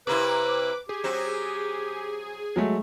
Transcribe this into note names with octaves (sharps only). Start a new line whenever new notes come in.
C3 A#3 E4 B4 D6
G4 G#4
F#3 C4 F#4
F#3 G#3 A3